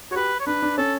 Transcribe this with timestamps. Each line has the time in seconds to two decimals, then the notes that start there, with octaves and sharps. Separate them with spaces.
0.11 F#4 C#5
0.16 G4 B4
0.40 C#5
0.47 D4 B4
0.63 D4
0.78 C#4 A4